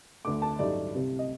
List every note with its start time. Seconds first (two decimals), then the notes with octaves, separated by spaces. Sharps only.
0.25 D2 D3 A3 D6
0.42 A5
0.59 A1 G2 F#3 A3 D#4 D5
0.94 C2 C3 G3
1.19 D#5